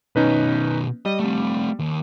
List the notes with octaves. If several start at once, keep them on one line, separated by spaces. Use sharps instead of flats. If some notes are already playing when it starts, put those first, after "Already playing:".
B2 D#3 C#4 D#4 B4
G3 D#5
A3 C4
D#2